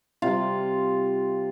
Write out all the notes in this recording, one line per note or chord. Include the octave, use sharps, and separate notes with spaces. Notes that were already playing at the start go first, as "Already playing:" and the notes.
C3 G3 F4